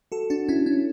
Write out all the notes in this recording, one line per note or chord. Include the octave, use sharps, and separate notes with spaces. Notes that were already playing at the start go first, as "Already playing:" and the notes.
F#4 A4
D4 F#4
C#4 E4
C#4